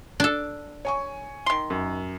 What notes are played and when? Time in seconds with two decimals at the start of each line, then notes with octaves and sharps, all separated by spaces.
0.20 D4 A4
0.85 C#5 G#5 C#6
1.46 D#3 C6
1.70 F#2